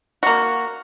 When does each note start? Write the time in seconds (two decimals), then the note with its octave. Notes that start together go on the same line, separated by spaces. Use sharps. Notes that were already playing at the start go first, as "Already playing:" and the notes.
0.23 A#3 F#4